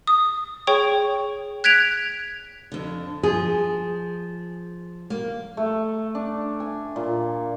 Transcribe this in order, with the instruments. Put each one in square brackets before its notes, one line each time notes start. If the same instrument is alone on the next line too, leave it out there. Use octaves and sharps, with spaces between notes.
[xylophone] D#6
G#4 C#5 G5 C#6
F#6 G#6 B6 D7 F7
[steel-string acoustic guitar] F2 D3
[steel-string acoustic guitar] F3 [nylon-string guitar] G#4
[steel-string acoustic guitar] A#3
[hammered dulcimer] A3
D4
G#5
A#2